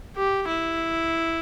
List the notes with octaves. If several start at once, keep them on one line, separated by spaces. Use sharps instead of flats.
G4
E4